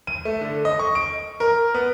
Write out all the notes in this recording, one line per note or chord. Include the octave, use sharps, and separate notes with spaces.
D#7
A3
D3
D#5
C#6
D7
A#4
B3